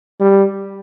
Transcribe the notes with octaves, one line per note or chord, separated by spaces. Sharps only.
G3